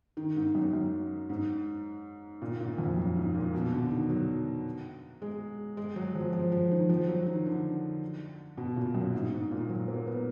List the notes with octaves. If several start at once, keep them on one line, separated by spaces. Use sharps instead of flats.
D#3
G#2
F#2
F#2
G#2
A#2
A#2
F2
F#2
G#2
A#2
B2
D3
D#3
F#3
G#3
G#3
F#3
F3
F3
F3
D#3
F3
F#3
D#3
D3
B2
A#2
F#2
G#2
G#2
A#2
F#3
A#3
B3